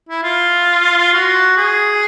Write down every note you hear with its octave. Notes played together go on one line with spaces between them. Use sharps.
E4
F4
F4
F#4
G#4